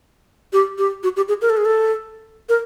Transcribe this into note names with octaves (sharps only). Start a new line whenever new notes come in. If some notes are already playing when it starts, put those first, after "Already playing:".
G4
G4
F#4
G4
G#4
A#4
A4
G#4
A4
A#4